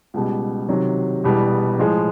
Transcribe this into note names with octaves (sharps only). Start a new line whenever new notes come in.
C#2 B2 G3
C3 D#3 F#3
E1 E2 B2 G3 B3
A2 F3 G#3